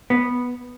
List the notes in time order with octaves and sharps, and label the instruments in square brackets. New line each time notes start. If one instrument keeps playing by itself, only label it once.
[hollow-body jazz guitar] B3